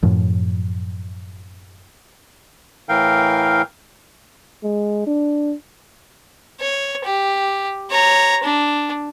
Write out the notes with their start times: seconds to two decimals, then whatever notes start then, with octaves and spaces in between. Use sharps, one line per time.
0.03 F#2 A2 F3
2.89 A2 E3 A#4 F5 G5
4.63 G#3
5.07 D4
6.61 C#5
7.04 G4
7.91 C#5 A#5
8.43 D4